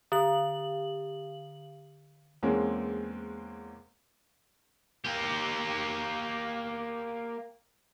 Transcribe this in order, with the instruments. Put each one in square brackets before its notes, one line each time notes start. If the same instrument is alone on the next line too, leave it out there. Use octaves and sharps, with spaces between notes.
[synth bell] D3 F#7
[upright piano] E2 G#3 A#3 C4 C#4
[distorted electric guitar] A#3 G4